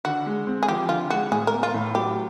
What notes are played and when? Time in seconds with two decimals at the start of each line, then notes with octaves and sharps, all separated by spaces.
0.05 D3 F#4
0.26 G#3
0.47 C4
0.63 G#4
0.68 F3 G4
0.89 D3 F4
1.10 G#3 F#4
1.31 A2 G#4
1.47 A#4
1.52 B3
1.63 F4
1.74 A2
1.95 F#3 G4